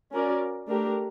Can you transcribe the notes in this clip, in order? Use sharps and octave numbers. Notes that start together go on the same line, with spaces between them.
C#4 F#4 A#4 D5
A3 D4 G4 A#4